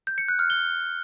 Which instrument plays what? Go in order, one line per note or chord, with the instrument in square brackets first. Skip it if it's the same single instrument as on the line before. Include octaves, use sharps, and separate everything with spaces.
[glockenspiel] G6
C#7
F#6
F6
G7